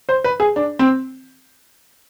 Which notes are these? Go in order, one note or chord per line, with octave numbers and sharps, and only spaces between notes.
C5
B4
G#4
D4
C4